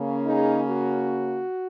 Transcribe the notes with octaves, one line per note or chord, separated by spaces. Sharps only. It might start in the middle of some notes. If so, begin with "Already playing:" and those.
Already playing: C#3 A#3 C#4
D#4 G#4
F#4